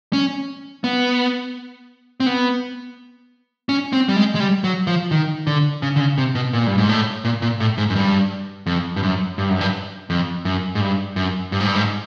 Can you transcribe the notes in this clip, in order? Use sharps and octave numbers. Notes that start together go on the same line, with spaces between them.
C#4
B3
C4
B3
C#4
C4
G3
G#3
G#3
G3
F#3
F3
D#3
D3
C#3
D3
C#3
C3
B2
A#2
G2
G#2
A2
A#2
A#2
A2
G#2
F#2
G2
F2
G2
F#2
G2
F#2
G2
F2
F#2
G#2
G2
F#2
G2
G#2
G2
G#2